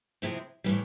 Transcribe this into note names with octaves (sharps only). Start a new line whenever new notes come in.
C3 F3 G#3 C4 E4
A2 E3 G3